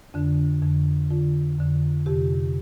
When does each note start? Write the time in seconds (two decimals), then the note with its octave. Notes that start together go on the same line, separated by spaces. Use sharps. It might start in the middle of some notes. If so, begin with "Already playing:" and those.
0.14 F2 D3 D4
0.62 F2 D3
1.10 F2 D3 F4
1.58 F2 D3
2.06 F2 C3 G4